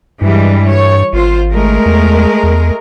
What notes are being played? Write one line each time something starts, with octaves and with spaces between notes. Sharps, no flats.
G2 E3 G3 G#3
C#5
G#1 F4 C5
G#3 A3 A#4
E2
E2